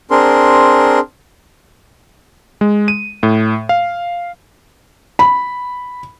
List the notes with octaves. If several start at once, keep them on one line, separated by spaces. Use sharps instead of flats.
C4 D4 G#4 A#4 C6
G#3
D#7
A2
F5
B5